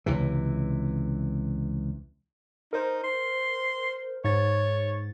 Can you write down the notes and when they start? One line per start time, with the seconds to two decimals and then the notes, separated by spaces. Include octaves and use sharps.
0.06 C#2 C3 E3
2.73 D#4 A#4 C5
3.03 C6
4.24 G#2 C#5 A6